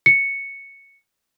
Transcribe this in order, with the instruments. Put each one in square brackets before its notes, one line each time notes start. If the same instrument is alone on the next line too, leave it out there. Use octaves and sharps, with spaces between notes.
[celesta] C#7